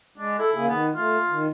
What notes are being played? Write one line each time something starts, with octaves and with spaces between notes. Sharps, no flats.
G#3 D4
E4 A4
C#3 A#3 G#4
D#3 B3
A3 F4
D#3